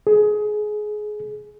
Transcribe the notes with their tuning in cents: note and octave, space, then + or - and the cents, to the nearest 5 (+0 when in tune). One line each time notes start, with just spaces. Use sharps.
G#4 +20